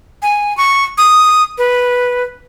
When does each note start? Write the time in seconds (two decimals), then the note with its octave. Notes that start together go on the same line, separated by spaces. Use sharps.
0.22 G#5
0.57 C#6
0.98 D#6
1.58 B4